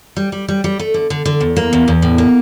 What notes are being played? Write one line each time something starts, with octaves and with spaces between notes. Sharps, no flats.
G3
G3
G3
G3
A3
D3
D3
D3
E2
A#3
E2
E2
A2
A#3